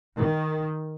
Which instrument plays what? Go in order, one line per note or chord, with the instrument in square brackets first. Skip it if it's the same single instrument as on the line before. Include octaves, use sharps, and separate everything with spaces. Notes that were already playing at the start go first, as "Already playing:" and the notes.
[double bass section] D#3